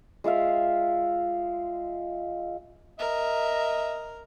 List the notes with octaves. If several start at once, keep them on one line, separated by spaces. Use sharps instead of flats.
G#3 F4 E5 F5
A#4 D#5 E5